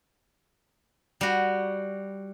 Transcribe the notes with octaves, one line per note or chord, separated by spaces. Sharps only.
G3 F#4